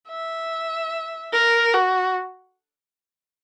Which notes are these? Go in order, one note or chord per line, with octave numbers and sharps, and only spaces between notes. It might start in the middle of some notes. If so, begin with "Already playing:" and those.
E5
A#4
F#4